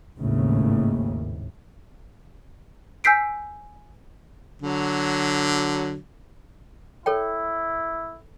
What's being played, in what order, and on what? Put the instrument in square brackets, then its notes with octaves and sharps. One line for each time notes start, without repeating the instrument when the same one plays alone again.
[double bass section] G#1 D#2 A2 C#3
[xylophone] G#5 E6 G6 B6 C7 D7
[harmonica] D3 F#3
[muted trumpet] E4 [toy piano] A4 C#5 G5